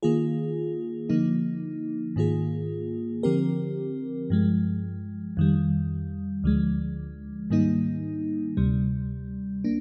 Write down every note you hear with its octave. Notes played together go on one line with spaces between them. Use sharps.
D#3 A#3 F4 G#4
D3 F3 A#3 D#4
G#2 D#3 A#3 F4 G#4
D3 F3 C4 G4 A#4
G2 F3 G#3
F2 D#3 G3
D2 D3 F3 G#3
G#2 D#3 G3 A#3 D#4
D2 C3 G3
A#3 D4